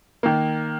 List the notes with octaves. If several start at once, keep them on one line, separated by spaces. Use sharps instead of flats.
D#3 A#3